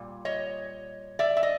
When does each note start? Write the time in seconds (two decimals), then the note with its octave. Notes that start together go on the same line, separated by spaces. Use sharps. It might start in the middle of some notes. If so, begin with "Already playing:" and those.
Already playing: A#2 G3
0.25 C#5 D#5
1.19 D5 E5
1.37 E5
1.43 D#5